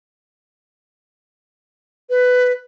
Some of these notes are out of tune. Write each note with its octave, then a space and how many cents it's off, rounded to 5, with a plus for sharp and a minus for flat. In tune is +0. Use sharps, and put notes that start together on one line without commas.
B4 +10